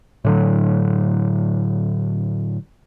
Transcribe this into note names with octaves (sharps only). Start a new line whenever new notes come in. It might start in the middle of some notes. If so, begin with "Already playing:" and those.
A2 D3 F#3